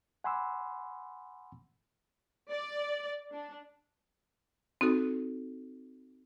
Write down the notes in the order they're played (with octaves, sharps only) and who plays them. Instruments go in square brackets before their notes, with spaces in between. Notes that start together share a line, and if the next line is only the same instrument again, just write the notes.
[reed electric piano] F#5 G#5 B5 C6 D6 E6
[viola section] D5
D4
[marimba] C4 D#4 F#4 A4